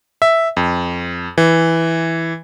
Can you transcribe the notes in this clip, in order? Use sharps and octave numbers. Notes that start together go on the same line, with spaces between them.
E5
F2
E3